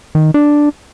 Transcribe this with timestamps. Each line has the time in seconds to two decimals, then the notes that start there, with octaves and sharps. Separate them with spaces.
0.15 D#3
0.34 D4